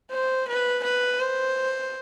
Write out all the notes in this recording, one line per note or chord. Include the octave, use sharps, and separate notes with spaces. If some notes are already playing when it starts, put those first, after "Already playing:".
C5
B4
B4
C5